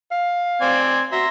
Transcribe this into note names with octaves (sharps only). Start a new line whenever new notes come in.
F5
C4 D5 G#5
F#4 E5 A#5 C6